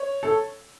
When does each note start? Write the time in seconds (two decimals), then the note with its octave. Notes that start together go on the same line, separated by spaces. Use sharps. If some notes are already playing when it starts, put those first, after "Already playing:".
Already playing: C#5
0.23 A4